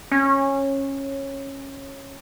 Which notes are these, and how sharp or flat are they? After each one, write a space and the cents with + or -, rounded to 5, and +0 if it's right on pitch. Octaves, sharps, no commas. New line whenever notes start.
C#4 -15